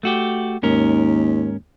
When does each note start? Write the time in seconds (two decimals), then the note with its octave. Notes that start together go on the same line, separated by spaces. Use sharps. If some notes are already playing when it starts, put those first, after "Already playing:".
0.03 A3 F#4 G4
0.63 D#2 G#2 C#4 A#4